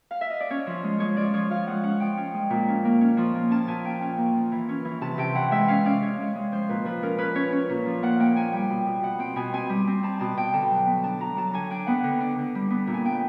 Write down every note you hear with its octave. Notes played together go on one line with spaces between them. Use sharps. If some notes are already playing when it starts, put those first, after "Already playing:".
F5
E5
D#5
D5
C#4 C#5
F3
G#3
G#3 C#5
F3 D5
F3 C#5
F3 F5
G#3 F#5
C#4 F#5
F3 G5
C#4
G#3
A#2
C#4
A#3
C#4
F3
A#3
C#4 A5
A#2 G#5
C#4 G5
C#4 G#5
A#3
F3
E3
C#4
E3
C3 A5
C3 G5
E3 F#5
G#3 E5
C#4 F5
C#4 D5
C3 C#5
G#3
G#3
F3 C5
A#2 B4
F3 B4
C#4 A#4
C#4 B4
C#4 C#5
C#4
A#2
F3
A#3 F#5
A#3 G5
A#3 G#5
G3 G5
B2
B2
B2 F#5
C4 G5
B2 G#5
C4 G#5
G3
C4
C4 A5
B2 A5
B2 G5
D3 A5
F#3
B3
D4 A5
F#3 A#5
F#3 A5
D3 G#5
D4 G5
B3 F#5
D3
D4
D3
G3
B3
A#2
G#5
B3 G5